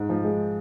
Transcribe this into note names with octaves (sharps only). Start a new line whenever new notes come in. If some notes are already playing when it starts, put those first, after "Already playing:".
Already playing: G#2
F3
G#3